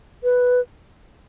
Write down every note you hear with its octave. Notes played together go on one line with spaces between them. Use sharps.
B4